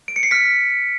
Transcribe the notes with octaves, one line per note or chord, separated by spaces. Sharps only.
D7
C#7
C7
F6 B6